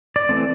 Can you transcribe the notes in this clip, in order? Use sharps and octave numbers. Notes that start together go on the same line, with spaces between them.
D5
E3 A3 C4